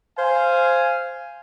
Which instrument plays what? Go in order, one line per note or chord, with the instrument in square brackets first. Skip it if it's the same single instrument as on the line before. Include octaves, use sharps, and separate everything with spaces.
[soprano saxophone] C5 [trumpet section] F5 G#5